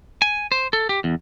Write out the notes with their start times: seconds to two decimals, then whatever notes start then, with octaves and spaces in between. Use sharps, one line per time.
0.22 G#5
0.52 C5
0.73 A4
0.89 G4
1.04 E2